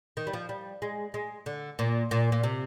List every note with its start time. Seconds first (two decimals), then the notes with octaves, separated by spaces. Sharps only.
0.17 D#3
0.27 G3
0.33 F3
0.49 G3
0.82 G#3
1.14 G#3
1.46 D3
1.79 A#2
2.11 A#2
2.32 A#2
2.43 C3